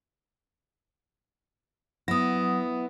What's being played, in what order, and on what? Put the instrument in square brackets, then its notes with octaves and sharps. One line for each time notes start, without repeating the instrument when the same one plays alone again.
[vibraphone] F#3 D#6 [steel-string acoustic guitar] B3 E4